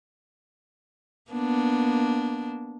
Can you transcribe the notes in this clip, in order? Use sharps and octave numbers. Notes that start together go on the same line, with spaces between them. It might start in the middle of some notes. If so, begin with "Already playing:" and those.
A#3 B3 D4